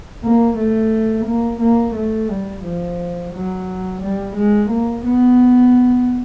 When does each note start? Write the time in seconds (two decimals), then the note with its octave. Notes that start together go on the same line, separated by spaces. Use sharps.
0.24 A#3
0.58 A3
1.26 A#3
1.61 A#3
1.96 A3
2.30 G3
2.64 F3
3.33 F#3
4.02 G3
4.36 G#3
4.71 A#3
5.05 B3